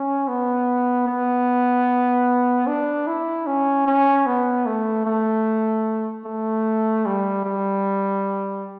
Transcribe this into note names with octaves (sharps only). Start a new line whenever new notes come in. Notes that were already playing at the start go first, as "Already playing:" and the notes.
Already playing: C#4
B3
B3
D4
E4
C#4
C#4
B3
A3
A3
A3
G3
G3